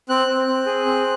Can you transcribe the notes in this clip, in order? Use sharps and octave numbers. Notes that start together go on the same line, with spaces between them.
C4 F#6
C4
C4
G#4
C4